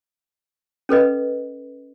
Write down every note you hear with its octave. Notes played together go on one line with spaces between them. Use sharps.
C#4 A4 B4 D#5